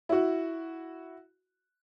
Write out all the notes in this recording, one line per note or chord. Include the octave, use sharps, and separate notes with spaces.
E4 F#4